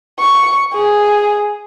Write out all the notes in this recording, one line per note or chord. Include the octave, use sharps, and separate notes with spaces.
C#6
G#4